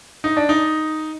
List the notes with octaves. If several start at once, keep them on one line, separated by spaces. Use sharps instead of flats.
D#4
D4
D#4